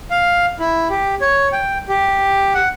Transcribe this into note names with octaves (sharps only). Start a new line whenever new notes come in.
F5
E4
G4
C#5
G5
G4
F#5